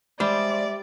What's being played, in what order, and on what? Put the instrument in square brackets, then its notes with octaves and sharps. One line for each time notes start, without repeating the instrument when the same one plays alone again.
[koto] G3 [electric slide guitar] G#3 C5 [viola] D5 [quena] E5